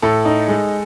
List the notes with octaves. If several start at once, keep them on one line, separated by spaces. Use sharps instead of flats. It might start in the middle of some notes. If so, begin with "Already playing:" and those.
A2 A4
D#4
G#3